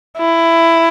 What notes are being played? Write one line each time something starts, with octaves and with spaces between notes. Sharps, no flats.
E4